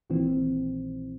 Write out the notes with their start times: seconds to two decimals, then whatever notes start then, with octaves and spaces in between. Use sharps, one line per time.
0.10 A#1 A#2 D#3 E3 C4